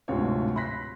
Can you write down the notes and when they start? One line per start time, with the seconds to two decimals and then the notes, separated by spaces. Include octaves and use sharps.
0.08 D1 D2 G#2 C3 F4 C#5
0.56 B5 C6 F#6 A#6 B6